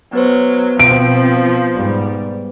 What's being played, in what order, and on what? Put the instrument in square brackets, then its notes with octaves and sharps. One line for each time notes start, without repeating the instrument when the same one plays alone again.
[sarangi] F#3 [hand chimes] B3 B4 C5
[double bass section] B2 C4 [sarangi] F3 [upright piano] D7
[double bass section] G#2 G3